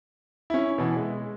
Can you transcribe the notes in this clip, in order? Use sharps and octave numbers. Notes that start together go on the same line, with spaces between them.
C#4 E4
B2 E3
G#3